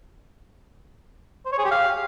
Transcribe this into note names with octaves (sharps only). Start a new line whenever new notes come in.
C5
C#5
G#4
G4
F5